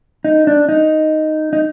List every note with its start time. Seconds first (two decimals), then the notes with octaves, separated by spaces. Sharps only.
0.24 D#4
0.47 D4
0.69 D#4
1.53 D#4